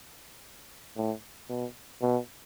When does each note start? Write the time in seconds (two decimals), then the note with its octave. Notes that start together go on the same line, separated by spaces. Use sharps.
0.96 A2
1.49 B2
2.02 B2